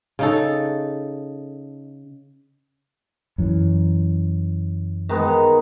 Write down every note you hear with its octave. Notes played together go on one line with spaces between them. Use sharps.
C#3 D#4 A4
F#2 E3
D#3 G#3 B3